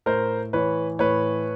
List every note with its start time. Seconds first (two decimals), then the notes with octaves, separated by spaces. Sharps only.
0.06 A2 A#4 C5
0.53 E3 B4 C#5
0.99 A2 B4 C#5